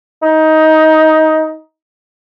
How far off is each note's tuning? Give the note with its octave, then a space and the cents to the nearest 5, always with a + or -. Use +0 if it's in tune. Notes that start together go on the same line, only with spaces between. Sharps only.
D#4 +15